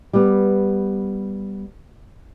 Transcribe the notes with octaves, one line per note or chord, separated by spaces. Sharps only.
G3 B3